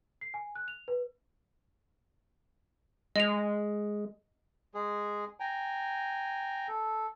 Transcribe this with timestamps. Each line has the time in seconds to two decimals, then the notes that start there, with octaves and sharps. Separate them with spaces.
0.21 C7
0.34 G#5
0.55 F#6
0.68 F7
0.88 B4
3.16 G#3 D#5 F7
4.75 G#3 G#4
5.40 G5 G#5 A#5
6.68 A4